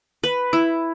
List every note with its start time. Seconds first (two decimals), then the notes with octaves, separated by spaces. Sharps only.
0.23 B4
0.53 E4